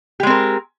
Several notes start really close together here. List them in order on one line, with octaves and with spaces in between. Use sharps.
G4 G#3 C4 A#4